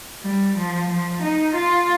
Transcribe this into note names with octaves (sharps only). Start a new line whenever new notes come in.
G3
F3
F3
D#4
F4